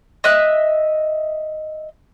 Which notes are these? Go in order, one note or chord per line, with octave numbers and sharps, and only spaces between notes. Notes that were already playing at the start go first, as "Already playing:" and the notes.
D#5 E5 F#6